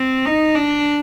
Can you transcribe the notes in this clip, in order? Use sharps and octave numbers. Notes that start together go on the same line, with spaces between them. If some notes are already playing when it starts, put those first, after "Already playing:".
Already playing: C4
D#4
D4